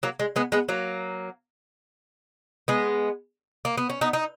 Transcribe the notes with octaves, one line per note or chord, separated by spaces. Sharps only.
F#3 A#3
G#3
G#3 B3
G#3 B3
F#3 A#3
G#3 B3
A#3
B3
C#4
B3 D#4
D#4